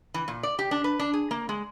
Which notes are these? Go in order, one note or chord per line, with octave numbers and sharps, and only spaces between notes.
E3
A#2
D5
G4
D4
B4
D4
G#4
A#3
G#3